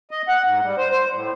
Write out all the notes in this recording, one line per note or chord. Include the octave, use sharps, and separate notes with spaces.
D#5
F#5
G#2
G3
C5
C5
A2